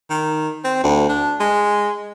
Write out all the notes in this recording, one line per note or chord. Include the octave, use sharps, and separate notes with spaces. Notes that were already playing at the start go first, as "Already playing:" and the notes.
D#3
C4
D2
D4
G#3